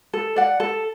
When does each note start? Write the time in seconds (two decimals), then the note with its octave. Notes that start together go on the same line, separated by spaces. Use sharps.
0.14 A4
0.36 D5 F#5
0.60 A4